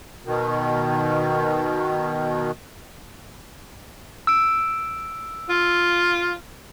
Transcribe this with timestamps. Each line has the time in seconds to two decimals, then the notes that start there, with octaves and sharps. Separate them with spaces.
0.25 B2 D#3
4.27 E6 D7
5.49 F4